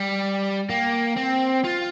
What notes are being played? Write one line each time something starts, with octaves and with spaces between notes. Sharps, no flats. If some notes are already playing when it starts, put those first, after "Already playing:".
Already playing: G3
A#3 G5
C4
F4